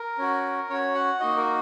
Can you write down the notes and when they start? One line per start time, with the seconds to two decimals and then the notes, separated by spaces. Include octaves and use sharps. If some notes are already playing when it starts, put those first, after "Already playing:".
Already playing: A#4
0.18 C#4 F#4
0.69 C#4 F#4 C#5
0.95 F#5
1.20 A#3 D#4 F#4 D#5
1.37 A#4